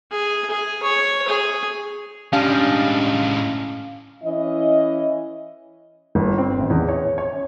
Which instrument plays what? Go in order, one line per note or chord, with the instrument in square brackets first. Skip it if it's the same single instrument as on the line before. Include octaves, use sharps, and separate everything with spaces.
[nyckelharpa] G#4
G#4
C#5
G#4
[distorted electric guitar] A2 G#3 [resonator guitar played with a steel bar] G3 D4 [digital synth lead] C#4 [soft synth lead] F5
[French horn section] E3 C#4 E4 D#5
[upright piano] G1
C4
A1
E2
C#5
C#5
C#4